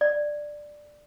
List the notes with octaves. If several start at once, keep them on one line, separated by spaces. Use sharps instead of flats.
D5